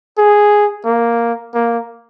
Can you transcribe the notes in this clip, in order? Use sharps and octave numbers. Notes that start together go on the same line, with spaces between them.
G#4
A#3
A#3